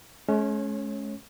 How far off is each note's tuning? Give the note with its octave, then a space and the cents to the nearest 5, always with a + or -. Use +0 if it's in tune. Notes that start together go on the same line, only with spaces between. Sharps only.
G#3 +45 C#4 +0 C#5 -20